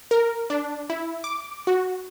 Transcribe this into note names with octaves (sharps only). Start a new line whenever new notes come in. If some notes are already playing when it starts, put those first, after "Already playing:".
A#4
D4
E4
D6
F#4